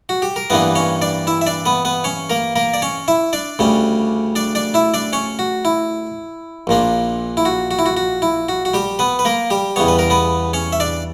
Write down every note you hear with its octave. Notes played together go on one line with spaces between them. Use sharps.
F#4
G4
A#4
G2 E3 A#3 B3 D4 B4
C#4 C#5
D4 D5
E4 E5
E5
D4 D5
B3 B4
B3 B4
C#4 C#5
A#3 A#4
A#3 A#4
D5
C#4 C#5
E4 E5
D4 D5
D2 C#3 G3 C#4
D4 D5
D4 D5
E4 E5
D4 D5
C#4 C#5
F#4
E4
A#1 A#2 A#3 D4
E4
F#4
F#4
E4
F#4
F#4
E4
F#4
F#4
G3 G4
B3 B4
B4
A#3 A#4
G3 G4
E2 C#3 G3 B3 C#5
B4
A#4
B3 B4
C#4 C#5
E5
D4 D5